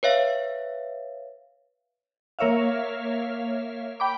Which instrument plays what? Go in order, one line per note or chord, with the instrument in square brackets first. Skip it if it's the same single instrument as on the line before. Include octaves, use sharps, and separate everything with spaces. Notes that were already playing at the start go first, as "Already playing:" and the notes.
[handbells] B4 C#5 E5 F5
[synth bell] A#3 A#4 C#5 E5 F5
G5 B5 D6